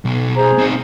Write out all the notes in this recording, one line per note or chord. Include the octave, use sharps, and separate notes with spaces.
B1 B2
G#4 C5 A#5
C4 D#4